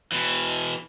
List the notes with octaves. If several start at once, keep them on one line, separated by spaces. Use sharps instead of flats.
B2 E3